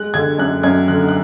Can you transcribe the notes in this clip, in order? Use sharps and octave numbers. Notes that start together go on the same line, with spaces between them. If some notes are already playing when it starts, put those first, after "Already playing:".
Already playing: G#3 F#6
D3 G#6
F#2 F#6
F#2 G#6
D3 F#6
F#6